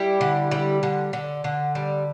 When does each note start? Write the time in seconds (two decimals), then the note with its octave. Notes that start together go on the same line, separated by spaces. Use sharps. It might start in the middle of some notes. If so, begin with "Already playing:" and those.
Already playing: G3 E4 G4
0.21 D3
0.51 G3
0.83 D3
1.13 D3
1.44 D3
1.75 G3